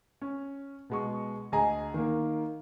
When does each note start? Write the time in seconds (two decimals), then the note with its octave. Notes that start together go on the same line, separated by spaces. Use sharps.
0.22 C#4
0.90 B2 G#3 C#6
1.52 D2 G#4 D#5 G#5 A#5
1.94 D#3 A#3